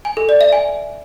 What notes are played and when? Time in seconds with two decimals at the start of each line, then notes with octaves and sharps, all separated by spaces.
0.05 G#5
0.17 A4
0.29 D5
0.41 E5
0.53 G#5